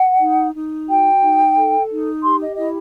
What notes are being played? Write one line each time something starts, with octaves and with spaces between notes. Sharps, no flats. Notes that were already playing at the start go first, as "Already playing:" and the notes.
Already playing: F#5
D#4
D#4
F#4 G5
D#4
A4
D#4
G4 C6
D#5
E4 D#5